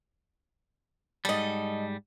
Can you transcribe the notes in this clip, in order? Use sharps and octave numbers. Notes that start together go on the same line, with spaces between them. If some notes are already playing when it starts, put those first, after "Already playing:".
G#2 G3 A4 D#5